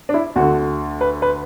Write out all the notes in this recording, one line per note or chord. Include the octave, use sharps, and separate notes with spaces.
D4
E4
D2 D3 F#4
B4
B4